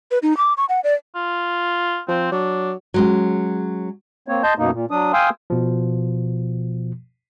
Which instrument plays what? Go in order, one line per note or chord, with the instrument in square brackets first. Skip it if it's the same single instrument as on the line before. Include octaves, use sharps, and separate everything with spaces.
[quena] B4
D#4
D6
C#6
F#5
D5
[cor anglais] F4
[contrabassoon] F3 [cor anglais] C4
[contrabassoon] F#3 [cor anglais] D4
[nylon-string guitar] F#3 G#3 C#4
[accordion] A#3 C4 C#5
D#5 A5 C6 G6
F#2 B2 A#3 D#4
A#2
F#3 D4 D#6
F5 G5 G#5 C6 D#6 E6
[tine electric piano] B2 F3